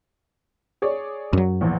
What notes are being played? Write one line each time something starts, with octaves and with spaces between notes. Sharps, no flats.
G#4 C#5 D5
F#2 F#3
A#1 E2